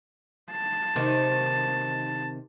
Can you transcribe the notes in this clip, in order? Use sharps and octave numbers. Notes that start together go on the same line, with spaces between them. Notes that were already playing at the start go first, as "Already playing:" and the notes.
A5
C3 D#3